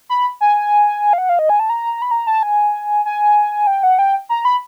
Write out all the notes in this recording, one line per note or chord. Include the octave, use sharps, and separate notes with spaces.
B5
G#5
F5
F#5
F5
D#5
G#5
A5
A#5
B5
A#5
A5
G#5
G#5
G5
F#5
G5
A#5
B5